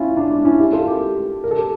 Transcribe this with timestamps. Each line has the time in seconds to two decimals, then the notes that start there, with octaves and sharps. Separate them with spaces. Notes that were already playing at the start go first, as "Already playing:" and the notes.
Already playing: C#4 E4 F4
0.17 D4
0.31 D4
0.45 C#4 E4
0.59 E4 G4
0.73 F4 A4
0.87 G4 A#4
1.44 A#4
1.51 A4
1.58 G4